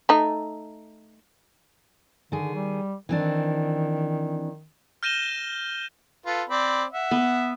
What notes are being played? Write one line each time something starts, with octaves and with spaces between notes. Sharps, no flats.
A3 D#4
D3 D#3 G#4
G3
D#3 E3 C4 D4
F6 G6 A#6 D#7 E7 G7
F4 A4 B4
C4 D5 B5
E5 F#5
B3